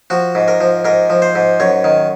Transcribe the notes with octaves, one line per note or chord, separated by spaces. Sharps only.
F3 F#4
G#2
A#4
F3
G#2 A#4
F3
C5
G#2
F#2 C#5
D#3